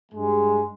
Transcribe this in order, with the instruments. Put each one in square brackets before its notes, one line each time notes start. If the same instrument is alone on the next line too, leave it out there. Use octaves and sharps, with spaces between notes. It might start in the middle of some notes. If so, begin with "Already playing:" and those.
[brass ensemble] G2 G3 G#3